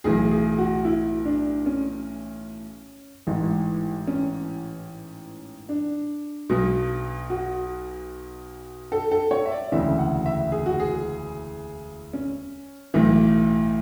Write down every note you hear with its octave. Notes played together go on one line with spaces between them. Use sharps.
B1 A2 E3 G#4
G#4
F#4
E4
D4
C#4
A1 G#2 E3
C#4
D4
B1 B2
F#4
A4
A4
C#5
E5
D5
E1 D2 C#3 E3 E5
F#5
E5
G#4
F#4
G#4
C#4
B1 A2 E3